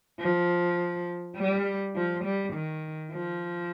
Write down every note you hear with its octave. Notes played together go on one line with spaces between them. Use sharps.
F3
G3
F3
G3
D#3
F3